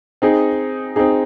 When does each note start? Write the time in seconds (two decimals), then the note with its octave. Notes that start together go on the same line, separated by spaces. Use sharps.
0.22 C4 D#4 G#4
0.96 C4 D#4 G#4